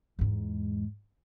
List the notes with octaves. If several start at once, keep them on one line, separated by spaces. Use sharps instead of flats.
E2 G#2